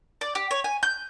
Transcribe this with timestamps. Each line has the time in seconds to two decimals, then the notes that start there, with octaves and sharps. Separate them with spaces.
0.21 D5
0.35 G4
0.51 C#5
0.64 G#5
0.83 G6